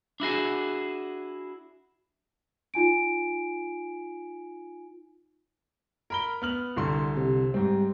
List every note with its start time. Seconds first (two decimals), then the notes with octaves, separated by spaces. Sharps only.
0.20 D4 E4 F#4 G#4
2.74 D#4 F4 G#5 D7
6.10 A#4 B5 G7
6.42 B3 F6 F#7
6.76 C2 D3 C6
7.17 C3
7.54 G#2 G3 C4